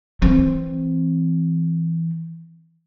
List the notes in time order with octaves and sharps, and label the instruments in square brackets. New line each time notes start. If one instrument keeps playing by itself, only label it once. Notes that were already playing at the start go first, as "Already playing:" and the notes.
[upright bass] E3 C4